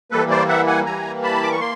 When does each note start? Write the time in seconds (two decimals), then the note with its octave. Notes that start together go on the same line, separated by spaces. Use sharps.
0.11 E3 G3 A#3 A4 B4
0.30 C5 D5
0.49 E5 F#5
0.67 F#5 G#5
0.86 E3 G3 A#3 G#5 A#5
1.23 A5 B5
1.43 D6
1.52 C#6
1.60 A#3 C6